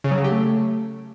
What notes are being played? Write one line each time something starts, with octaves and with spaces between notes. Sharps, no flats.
C#3
F#3
C#3
G4
A3